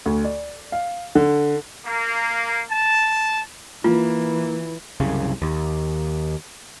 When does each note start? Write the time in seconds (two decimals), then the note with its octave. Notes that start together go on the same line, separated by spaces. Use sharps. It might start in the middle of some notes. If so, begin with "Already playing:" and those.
0.06 D2
0.24 D5
0.72 F5
1.15 D3
1.86 A#3
2.70 A5
3.84 E3 A#3 F4
5.00 C2 F#2 C#3
5.42 D#2